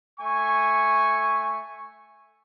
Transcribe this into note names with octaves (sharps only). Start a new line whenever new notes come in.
A3 G#5 C#6